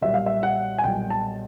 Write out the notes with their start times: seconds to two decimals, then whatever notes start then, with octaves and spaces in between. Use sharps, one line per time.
0.01 B1 A#2 G3 E5
0.14 F5
0.26 E5
0.43 F#5
0.78 G#5
0.84 B1 A#2 G3 G5
1.10 A5